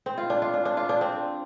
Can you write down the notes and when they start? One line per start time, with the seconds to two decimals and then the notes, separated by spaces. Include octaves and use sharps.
0.06 C4
0.18 F4
0.30 D4
0.42 F4
0.54 D4
0.65 D4
0.77 F4
0.89 D4
1.01 C4